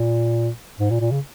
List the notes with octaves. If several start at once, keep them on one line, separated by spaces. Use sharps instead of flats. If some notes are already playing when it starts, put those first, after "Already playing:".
Already playing: A#2
G#2
A#2
A#2
C#3